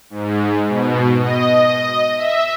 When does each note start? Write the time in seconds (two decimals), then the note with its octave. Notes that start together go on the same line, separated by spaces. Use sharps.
0.10 G#2
0.68 B2
1.19 D#5
2.16 E5